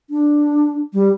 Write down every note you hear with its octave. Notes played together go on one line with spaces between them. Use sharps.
D4
G3